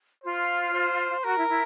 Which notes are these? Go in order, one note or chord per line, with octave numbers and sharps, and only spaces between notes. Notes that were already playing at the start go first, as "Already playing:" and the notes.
F4 C5
C5
F#4 A#4
E4
E4